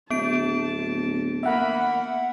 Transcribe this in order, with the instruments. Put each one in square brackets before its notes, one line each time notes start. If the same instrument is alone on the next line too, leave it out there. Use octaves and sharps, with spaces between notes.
[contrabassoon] D1 [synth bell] B3 D7 [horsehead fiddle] A5
[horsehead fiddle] A#3 B5 [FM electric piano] E5 F#5